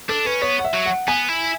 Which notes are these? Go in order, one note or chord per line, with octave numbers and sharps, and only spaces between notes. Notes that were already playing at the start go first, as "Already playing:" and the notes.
D4 A4
C#4 B4
B3 C#5
F#5
E5
F#3
F#5
B3 G#5
E4